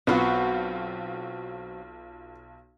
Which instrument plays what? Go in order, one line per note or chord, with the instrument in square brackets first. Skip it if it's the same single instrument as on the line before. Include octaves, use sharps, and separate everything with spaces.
[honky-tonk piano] B1 F4 [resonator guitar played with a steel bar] F#3 C4 F#4 [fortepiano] B3